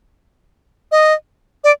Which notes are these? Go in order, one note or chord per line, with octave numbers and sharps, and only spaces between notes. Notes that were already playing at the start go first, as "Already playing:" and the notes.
D#5
D5